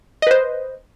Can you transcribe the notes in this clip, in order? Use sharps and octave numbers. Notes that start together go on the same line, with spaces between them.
B4 C5 D#5